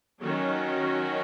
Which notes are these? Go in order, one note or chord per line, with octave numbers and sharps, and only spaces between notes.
D#3 F#3 C#4 F#4